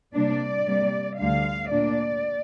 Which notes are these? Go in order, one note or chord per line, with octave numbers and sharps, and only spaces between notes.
C3 G3 A#3 D4 D5
C3 G3 A#3
D2 D3 G3 F5
A#2 A#3 D4 D5